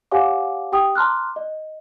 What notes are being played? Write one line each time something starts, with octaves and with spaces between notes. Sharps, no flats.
G4 C#5 F5 F#5 G#5 D6
G4 G5 D#6
A5 A#5 C6 D6 F6 F#6
D#5